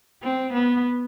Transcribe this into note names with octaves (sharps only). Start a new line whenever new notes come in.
C4
B3